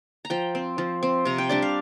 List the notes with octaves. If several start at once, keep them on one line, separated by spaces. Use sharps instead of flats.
A#5
F3 G5
C4
F3
C4
C3 A#5
G5
G3 D4 D5
F5